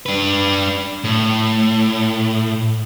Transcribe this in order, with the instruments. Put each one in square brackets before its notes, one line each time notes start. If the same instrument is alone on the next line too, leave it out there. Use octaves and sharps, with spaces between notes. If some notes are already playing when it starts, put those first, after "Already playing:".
[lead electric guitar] D4 B4
A2